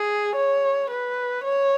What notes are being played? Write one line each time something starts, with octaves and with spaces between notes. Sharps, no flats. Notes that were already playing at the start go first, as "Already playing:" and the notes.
Already playing: G#4
C#5
B4
C#5